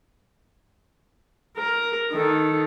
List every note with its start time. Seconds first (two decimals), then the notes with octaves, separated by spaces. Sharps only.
1.57 A#4
2.12 D#3 A4